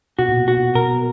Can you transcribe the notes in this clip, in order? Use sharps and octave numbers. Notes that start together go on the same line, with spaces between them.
B2 F#4
A#2
B2
F#4
B2
B2 A#4